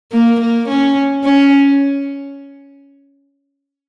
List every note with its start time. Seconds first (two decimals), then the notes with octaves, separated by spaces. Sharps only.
0.12 A#3
0.40 A#3
0.68 C#4
1.25 C#4